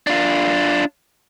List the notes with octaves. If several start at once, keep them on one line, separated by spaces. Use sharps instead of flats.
D4 F4